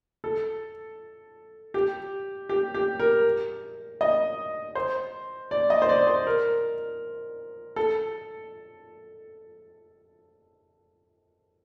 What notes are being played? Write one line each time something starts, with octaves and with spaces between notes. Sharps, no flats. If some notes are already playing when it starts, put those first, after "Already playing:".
A4
G4
G4
G4
A#4
D#5
C5
D5
D#5
C5
D5
C5
A#4
A4